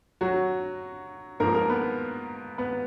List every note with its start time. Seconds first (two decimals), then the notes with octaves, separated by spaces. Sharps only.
0.21 F#3 F#4
1.40 G#2 F3 A#3 A#4
1.55 A#3 A#4
1.70 B3 B4
2.58 B3 B4